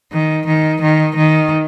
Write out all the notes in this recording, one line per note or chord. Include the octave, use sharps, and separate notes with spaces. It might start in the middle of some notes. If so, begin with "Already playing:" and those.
D#3
D#3
D#3
D#3